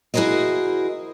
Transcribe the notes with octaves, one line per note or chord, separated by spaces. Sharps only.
E4 F#4 G#4 A#4 C5 D#5